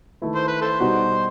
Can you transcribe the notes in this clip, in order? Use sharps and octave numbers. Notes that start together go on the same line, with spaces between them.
D#3 A3 E4 B4
C5
B4
A4 C5
B2 G3 D#4 F#4